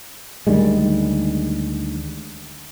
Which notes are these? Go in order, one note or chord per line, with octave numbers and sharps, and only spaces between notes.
D2 D#3 G3 G#3